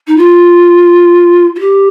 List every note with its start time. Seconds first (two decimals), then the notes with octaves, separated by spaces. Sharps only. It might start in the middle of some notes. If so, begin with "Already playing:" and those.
0.07 D#4
0.17 F4
1.55 F4
1.59 G4